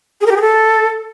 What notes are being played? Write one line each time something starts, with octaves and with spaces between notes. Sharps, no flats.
G#4
A#4
G4
G#4
A4